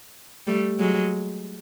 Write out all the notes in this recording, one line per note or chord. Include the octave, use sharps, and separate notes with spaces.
G3 A3
F#3 G#3